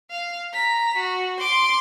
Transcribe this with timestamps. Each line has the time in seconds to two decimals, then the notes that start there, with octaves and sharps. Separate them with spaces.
0.10 F5
0.53 A#5 B6
0.97 F#4
1.40 C6 D6